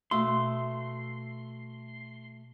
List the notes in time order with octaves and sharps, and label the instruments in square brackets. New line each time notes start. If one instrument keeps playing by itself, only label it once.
[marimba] B2 E6 [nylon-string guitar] A3 F#4 F5 [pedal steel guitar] C6